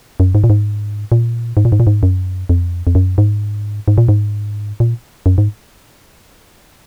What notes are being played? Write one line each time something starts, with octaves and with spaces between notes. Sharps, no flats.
F#2
G#2
A#2
G#2
A#2
G#2
A#2
G#2
A#2
G#2
F#2
F2
F2
F#2
G#2
G#2
A#2
G#2
A#2
F#2
G#2